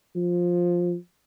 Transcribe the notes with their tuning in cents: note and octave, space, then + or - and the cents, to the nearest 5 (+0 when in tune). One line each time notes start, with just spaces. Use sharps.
F3 +10